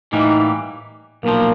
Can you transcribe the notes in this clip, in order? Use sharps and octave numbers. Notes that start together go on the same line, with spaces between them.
A2 E3 G3 A#3 D#4
B1 A#2 F3 A#3